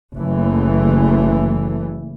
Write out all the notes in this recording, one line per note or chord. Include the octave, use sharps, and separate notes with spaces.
F#1 E3 A3